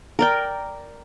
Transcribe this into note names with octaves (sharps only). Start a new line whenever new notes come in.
A#4 D5 G5